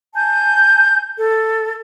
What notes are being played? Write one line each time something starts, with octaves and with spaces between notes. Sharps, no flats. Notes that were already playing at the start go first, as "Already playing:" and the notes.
G#5 A5 G6
A4